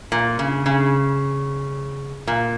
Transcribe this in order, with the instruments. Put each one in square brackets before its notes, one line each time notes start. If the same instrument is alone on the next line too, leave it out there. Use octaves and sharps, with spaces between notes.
[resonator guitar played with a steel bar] A#2
C#3
C#3
A#2